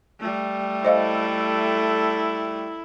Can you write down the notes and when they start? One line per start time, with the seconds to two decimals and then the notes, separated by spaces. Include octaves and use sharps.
0.20 G3 A3
0.85 E4 A4 C5 D#5 F5